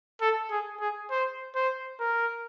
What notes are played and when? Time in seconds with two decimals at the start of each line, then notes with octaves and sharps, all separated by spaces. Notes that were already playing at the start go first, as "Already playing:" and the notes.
0.21 A4
0.51 G#4
0.80 G#4
1.10 C5
1.55 C5
2.00 A#4